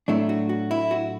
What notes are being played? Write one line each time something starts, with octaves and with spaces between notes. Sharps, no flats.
A2 F#3 A3 D4 E4
F#4
F#4
E4
F#4